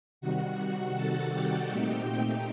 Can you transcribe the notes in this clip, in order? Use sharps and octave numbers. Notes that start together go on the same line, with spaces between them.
C3 D#3 G3 F#4 F#5
F#4 F#5
A4 A5
G4 G5
A#2 A3 C4 D#4
G4 G5